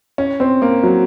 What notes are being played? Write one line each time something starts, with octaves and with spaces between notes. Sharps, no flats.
C#4
C4
A#3
F#3